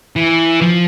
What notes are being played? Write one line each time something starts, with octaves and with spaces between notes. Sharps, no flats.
E3
F3